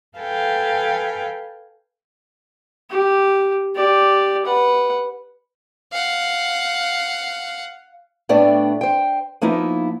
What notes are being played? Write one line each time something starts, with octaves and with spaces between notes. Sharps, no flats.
A4 B4 F5 G5 G#5
G4
G4 D5
B4 F#5
F5 F#5
A2 A3 B3 D4 D5 G5
C5 G5
F3 A#3 B3 D#4 E4